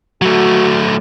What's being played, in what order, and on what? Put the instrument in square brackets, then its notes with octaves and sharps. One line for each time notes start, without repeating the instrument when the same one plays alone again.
[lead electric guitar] F#3 A3 [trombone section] F#4